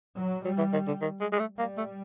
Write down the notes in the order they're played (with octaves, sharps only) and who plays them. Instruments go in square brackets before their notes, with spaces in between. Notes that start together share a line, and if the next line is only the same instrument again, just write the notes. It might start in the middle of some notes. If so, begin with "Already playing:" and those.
[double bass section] F#3
[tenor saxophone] F#3 [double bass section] G3
[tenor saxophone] E3
D#3
D3
D#3
G#3
G#3
A3
[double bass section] G3 [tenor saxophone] A#3
[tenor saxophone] A3